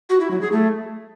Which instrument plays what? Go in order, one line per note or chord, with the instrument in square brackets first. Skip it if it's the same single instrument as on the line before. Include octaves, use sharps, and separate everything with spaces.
[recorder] F#4
E4
F#3
G#4
A3